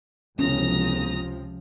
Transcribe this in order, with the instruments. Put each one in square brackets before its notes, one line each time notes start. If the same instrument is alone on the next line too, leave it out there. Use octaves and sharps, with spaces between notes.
[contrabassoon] E1 [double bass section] C#2 C3 F3 [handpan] C#4 [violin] A#5 D#6